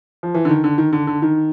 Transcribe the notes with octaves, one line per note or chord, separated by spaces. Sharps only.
F3
E3
D3
D#3
D3
D#3
D3
D3
D#3